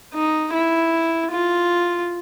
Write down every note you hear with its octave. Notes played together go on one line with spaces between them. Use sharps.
D#4
E4
F4